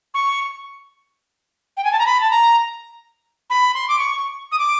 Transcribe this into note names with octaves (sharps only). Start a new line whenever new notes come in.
C#6
G5
G#5
A5
A#5
B5
A5
A#5
B5
C6
D6
C#6
D#6
D6